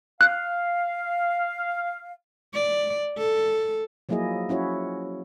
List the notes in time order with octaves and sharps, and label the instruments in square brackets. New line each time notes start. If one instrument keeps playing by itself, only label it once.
[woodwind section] F5 [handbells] F#6
[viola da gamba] D5
A4
[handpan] F3 F#3 A#3 E4 G#4 D#5
C#4 E4 F#4 C#5